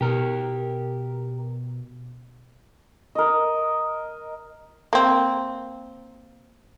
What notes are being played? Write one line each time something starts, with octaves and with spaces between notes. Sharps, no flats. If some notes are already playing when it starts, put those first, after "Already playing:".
B2 G4 A#4
A#4 D#5
A#3 C4